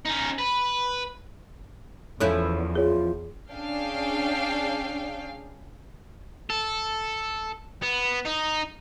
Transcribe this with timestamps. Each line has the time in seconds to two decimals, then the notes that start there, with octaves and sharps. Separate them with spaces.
0.05 C#4 D#4
0.38 B4
2.20 E2 F3 C#4 E4 A4 F#6
2.75 F4 G#4 C#5
3.51 C#4 D4 G#4 F5 G5
6.50 A4
7.82 B3
8.26 D#4